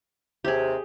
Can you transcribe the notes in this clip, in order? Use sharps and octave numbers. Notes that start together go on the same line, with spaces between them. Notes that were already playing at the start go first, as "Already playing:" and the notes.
D#2 C3 G4 G#4